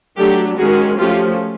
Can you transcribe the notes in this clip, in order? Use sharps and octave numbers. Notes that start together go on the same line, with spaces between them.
F#3 A3 D4 G4 A4
D#3 G#3 C#4 F#4 G#4
F3 A3 C#4 F4 G4